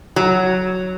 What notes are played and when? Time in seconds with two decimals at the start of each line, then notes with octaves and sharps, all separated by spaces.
0.16 F#3